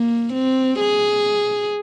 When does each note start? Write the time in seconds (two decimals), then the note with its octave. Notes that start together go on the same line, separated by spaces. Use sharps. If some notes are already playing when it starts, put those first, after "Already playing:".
Already playing: A#3
0.33 C4
0.79 G#4